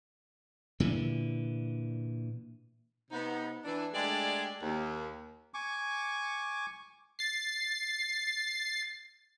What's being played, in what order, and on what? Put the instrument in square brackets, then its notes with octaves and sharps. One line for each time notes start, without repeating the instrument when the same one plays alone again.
[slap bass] A#2 D3 E3
[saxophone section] C3 B3 D#4
E3 D4
G#3 A3 D4 G4 G#4 D5
D#2
[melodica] G#5 C#6 D6
[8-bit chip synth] A6 C7